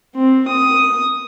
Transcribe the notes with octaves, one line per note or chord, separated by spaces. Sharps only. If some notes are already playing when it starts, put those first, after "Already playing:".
C4
D#6